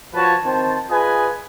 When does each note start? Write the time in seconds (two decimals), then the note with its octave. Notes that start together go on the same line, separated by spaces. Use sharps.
0.14 F3 F4 F#4 B4 C#5 A5
0.45 D#3 C4 C5 A5
0.90 F4 G#4 B4 D#5 G#5